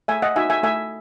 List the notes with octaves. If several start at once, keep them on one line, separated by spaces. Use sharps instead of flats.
A3 E5 G#5
D#5 F#5
D#4 F#4 E5 G#5
E5 G#5
A3 E5 G#5